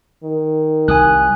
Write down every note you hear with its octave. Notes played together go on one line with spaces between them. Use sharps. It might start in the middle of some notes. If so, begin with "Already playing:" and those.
D#3
C2 G#5 D#6 F#6